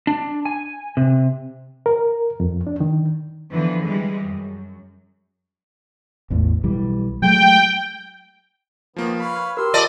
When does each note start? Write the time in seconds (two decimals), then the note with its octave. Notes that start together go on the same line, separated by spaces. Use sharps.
0.07 D4
0.45 G#5
0.97 C3
1.86 A#4
2.40 F2
2.67 D4
2.80 D#3
3.51 D3 E3 F3 B3
3.85 E3 G3 G#3
4.25 F#2
6.30 A1 E2 A2
6.64 B1 E3 G3
7.22 F#3 G#3 A3 G5
8.96 D#3 F3 A#3 B3
9.20 B4 C#5 F5 B5
9.57 G4 A#4 C6 E6
9.74 F4 D5 D#5 A5